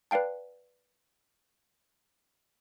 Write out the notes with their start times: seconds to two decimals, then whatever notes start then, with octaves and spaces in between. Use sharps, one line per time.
0.11 B4 D5 F5 G5 A5